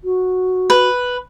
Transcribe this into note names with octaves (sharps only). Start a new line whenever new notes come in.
F#4
B4